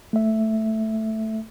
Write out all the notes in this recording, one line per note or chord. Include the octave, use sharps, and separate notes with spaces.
A3 E5